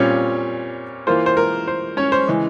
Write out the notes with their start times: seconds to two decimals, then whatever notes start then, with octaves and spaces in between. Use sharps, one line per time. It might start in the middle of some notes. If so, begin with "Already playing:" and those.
Already playing: A#2 G3 C4 C#4 F4 C#5
1.07 E3 A#3 F4 C5
1.26 C5
1.37 A#4
1.67 C5
1.97 C#4 C#5
2.12 C5
2.28 C#3 E3 G#3